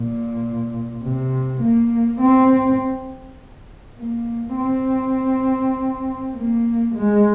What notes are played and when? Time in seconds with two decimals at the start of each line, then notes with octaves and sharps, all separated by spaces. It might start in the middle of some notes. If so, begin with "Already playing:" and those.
Already playing: A#2
1.02 C3
1.62 A#3
2.21 C4
3.98 A#3
4.57 C4
6.35 A#3
6.95 G#3